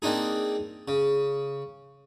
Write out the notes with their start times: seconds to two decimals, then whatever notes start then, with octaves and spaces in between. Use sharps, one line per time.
0.02 A#3 C4 D4 D#4 G#4
0.88 C#3